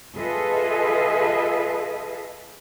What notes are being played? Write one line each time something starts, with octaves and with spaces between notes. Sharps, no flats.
F4 G#4 A4 B4 D#5 E5